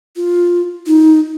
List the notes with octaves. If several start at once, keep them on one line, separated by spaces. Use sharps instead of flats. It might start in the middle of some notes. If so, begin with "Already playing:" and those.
F4
D#4